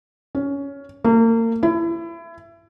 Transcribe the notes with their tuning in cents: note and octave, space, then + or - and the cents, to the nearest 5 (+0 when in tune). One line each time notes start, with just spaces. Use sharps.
C#4 +15
A#3 -35
E4 +25